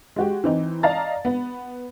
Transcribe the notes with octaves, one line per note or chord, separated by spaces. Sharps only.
G#3 F#4 G4
E3 C4 D#4
D5 D#5 F5 A5 A#5 A6
B3